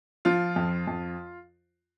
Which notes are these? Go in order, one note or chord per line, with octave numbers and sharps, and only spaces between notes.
F3 F4
F2
F2